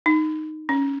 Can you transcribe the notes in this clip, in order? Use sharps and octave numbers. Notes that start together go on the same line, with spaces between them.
D#4
C#4